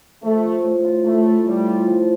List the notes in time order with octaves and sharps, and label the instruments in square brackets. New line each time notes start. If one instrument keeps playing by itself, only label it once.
[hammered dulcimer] F3 [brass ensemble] A3
[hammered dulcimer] F3
A2
F4
[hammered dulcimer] A2 [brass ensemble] A3
[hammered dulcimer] A2
[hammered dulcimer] A2 [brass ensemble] G3
[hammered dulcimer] F4
F3